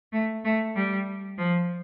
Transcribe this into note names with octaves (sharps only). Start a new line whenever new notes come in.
A3
A3
G3
F3